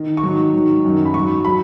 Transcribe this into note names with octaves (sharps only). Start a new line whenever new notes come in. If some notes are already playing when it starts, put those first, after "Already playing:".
Already playing: D#3
C#6
G#2 D#3 F#3
G#2 D#3 F#3
F#2 D#3 F#3
B5
G#2 F#3 C#6
F#3 B5